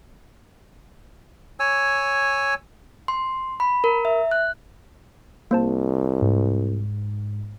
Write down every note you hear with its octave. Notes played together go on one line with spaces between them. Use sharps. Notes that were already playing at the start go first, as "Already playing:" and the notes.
C#5 G#5 E6
C6
B5
A#4
E5
F#6
C2 A#3 C5 A5
G#2